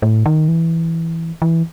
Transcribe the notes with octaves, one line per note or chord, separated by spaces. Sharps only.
A2
D#3
E3
E3